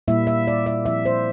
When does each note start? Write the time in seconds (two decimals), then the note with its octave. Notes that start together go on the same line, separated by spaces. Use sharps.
0.08 A#2 G3 A#3 E4 E5
0.27 E5
0.47 D5
0.66 E5
0.86 F3 C4 E4 E5
1.05 C5